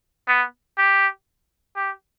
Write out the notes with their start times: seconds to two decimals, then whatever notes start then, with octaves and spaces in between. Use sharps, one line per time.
0.28 B3
0.78 G4
1.76 G4